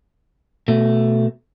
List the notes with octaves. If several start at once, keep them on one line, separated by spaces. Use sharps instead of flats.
B2 A3